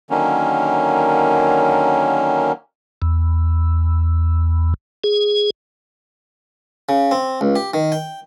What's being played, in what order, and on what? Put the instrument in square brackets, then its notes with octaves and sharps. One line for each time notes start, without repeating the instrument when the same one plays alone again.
[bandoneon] D3 D#3 F#3 A#3 C#4
[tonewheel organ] E2
G#4
[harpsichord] C#3
C4
C#2
G4
D#3
G5